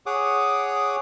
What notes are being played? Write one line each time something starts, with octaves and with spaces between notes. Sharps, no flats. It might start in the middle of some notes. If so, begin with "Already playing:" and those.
G#4 C#5 F#5 D6 D#6